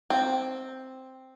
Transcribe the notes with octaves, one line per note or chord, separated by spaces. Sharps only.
C4